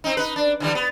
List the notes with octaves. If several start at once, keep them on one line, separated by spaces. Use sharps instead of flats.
C4 D#4
D#4 B4
D4
D3 E3 G3
B3